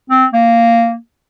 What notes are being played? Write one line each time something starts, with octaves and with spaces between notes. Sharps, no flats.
C4
A#3